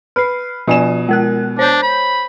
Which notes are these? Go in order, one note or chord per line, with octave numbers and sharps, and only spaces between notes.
B4 F6 C7
B2 F3 F4 D5 G#5 E7
G#3 A#4 F#6
D4 C5 C#5 G6
B5